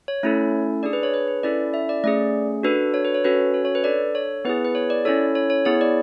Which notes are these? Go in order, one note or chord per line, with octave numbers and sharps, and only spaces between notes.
C#5
A3 C#4 E4 A4
D4 G#4 D5
B4
C#5
B4
B4
C#4 E4 A4 D5
E5
D5
A3 C#4 G#4 D5
D4 F#4 A4 B4
C#5
B4
C#5
C#4 F#4 A4 B4
C#5
C#5
B4
D4 A4 D5
C#5
B3 E4 G#4 B4
B4
C#5
D5
C#4 E4 A4 C#5
C#5
C#5
B3 E4 G#4 C#5
D5